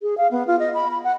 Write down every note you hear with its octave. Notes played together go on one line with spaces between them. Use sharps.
G#4
F5
B3
F4
D#5
B5
B5
F#5